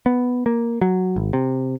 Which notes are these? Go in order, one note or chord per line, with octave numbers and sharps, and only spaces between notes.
B3
A#3
F#3
G#1
C3